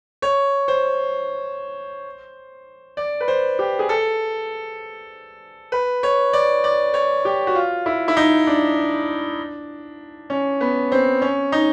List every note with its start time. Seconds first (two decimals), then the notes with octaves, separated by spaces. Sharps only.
0.22 C#5
0.68 C5
2.97 D5
3.20 B4
3.28 C5
3.59 G4
3.79 G#4
3.89 A4
5.72 B4
6.03 C#5
6.33 D5
6.64 D5
6.94 C#5
7.25 G4
7.47 F#4
7.55 F4
7.86 E4
8.08 E4
8.17 D#4
8.47 D4
10.30 C#4
10.61 B3
10.92 C4
11.22 C#4
11.52 D#4